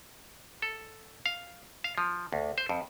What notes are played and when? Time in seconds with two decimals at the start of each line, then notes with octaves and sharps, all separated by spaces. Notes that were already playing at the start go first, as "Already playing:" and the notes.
0.62 A4
1.26 F5
1.84 F5
1.98 F3
2.33 D2
2.58 C5
2.69 F2